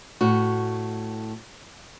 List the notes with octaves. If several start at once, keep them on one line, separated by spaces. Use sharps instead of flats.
A2 F#4